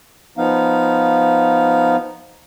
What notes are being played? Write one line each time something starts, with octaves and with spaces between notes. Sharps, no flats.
F3 B3 D#4 F5